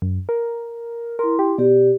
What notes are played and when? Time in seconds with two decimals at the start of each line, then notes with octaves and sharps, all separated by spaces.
0.02 F#2
0.29 A#4
1.19 E4 A#4 C6
1.39 G4
1.58 B2 G4 D5